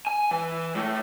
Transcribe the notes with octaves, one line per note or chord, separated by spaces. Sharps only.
G#5
E3
A2 A3